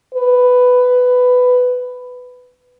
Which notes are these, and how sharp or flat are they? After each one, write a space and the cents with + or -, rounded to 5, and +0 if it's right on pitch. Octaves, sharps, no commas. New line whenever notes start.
B4 +10